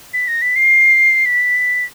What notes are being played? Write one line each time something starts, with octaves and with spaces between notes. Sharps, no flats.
B6
A#6
B6
C7
B6